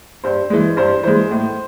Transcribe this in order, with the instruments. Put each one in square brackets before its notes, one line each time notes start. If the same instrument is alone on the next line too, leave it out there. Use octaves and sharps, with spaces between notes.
[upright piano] G2 C5
E3 G#3
G2 C5
E3 G#3 C5
A2